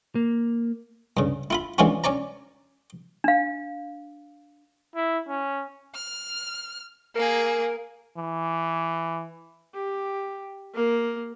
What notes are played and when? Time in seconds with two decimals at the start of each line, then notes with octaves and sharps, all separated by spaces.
0.15 A#3
1.17 G2 C#3
1.50 E4 F4 B5
1.78 E3 G#3 C#4 D4 F4 F#4
2.04 C#4 C#5 D5 A#5
3.24 D4 F5
4.96 E4
5.28 C#4
5.95 F6
7.15 A#3 G#4 A#4
8.17 E3
9.74 G4
10.74 A#3 A#4